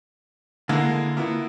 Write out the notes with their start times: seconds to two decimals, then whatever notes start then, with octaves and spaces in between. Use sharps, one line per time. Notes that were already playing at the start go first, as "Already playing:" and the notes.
0.69 D3 G#3 A#3 E4
1.17 A#3 B3 E4